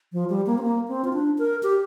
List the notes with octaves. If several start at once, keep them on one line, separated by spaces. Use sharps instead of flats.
F3
G3
A#3
C4
A#3
C4
F4
D4
A#4
G4